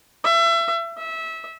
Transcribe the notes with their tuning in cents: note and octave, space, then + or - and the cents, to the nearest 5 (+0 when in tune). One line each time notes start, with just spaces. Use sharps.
E5 +30
E5 -20